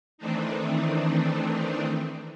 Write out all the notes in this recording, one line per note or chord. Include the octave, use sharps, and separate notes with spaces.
D#3 E3 A3 C4 D4 D#4